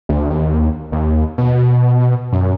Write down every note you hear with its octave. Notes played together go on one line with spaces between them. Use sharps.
D2
D#2
D#2
B2
F#2